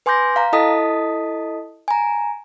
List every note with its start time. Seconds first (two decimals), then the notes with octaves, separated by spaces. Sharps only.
0.06 B4 G#5 C6 D6 G6 A#6
0.36 F5 A#5
0.53 E4 A4 D#5 A5 D#6 B6
1.88 G#5 A#5